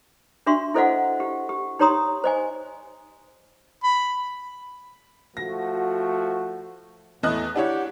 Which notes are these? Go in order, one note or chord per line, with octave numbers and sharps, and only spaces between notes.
D4 F#4 E5 C6 C#6
E4 A4 C5 D#5 F5 F#5
G4
G4
D#4 G4 C#5 A#5 C6 D#6
C5 D#5 G#5
B5
F3 A3 F#4 A#6
E2 A2 D#5 F#6
D4 E4 G4 C#5 F#5